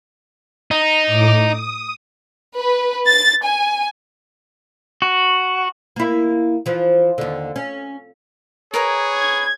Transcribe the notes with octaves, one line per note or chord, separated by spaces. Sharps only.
D#4
A2 D6
D#6
B4
A6
G#5
F#4
A#3 E4
E3 F3
D#2 D3
C#4
G#4 A#4 B4 C#5 A#5
G#6